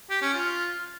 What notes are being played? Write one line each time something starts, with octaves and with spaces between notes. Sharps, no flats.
G4
C#4
F4